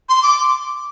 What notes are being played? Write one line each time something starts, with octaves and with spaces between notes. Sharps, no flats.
C6
D6